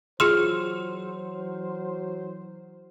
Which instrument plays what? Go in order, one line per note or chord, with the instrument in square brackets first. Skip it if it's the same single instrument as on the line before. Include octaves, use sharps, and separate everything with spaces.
[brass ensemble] E3 F#3 C5 [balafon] F4 G#4 C6 [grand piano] F6